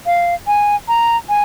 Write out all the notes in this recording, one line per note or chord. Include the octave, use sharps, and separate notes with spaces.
F5
G#5
A#5
G#5